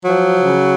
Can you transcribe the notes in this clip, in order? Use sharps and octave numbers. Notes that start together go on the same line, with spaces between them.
F3 F#3
C#3